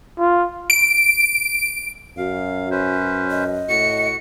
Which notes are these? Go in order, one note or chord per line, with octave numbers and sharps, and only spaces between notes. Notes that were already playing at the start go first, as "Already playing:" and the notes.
F4
D7
F#2 F#4 F5
C#4 B4 C5
D#5
A2 F#4 C#7